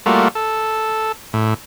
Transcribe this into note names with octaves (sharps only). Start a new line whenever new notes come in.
G3 A3 A#3 F4 F#4
A4
A2